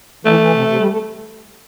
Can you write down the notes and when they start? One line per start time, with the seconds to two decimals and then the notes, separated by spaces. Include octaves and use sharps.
0.25 E3 A3
0.39 E3
0.53 C3
0.67 C3
0.78 G3
0.89 A3